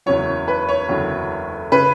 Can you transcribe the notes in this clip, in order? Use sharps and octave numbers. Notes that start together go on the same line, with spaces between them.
F#1 E2 C#3 F#3 C#5
B4
C#5
F#1 E2 D3 F#3
C#3 B4